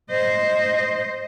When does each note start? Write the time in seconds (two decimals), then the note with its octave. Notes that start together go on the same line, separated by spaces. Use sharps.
0.11 C5 D#5